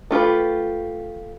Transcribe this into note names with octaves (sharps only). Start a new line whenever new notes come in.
A3 F4 G4 B4